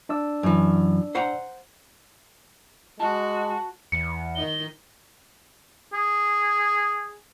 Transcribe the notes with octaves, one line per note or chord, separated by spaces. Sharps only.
D4 D5 E6
F#2 E3
C5 F#5 A#5
G#3 F#4 A5
E2 C#7
D#3 D#4 G7
G#4